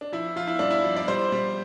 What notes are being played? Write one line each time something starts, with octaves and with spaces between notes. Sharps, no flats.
D4
F3 E4
F3 F4
E4
G2 D4
E4
F3
D5
G3 C5
G3